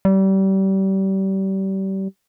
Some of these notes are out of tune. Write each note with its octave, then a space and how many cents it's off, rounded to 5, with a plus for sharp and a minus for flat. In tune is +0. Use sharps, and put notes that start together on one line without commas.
G3 -30